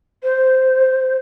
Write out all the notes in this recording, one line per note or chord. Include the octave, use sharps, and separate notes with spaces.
C5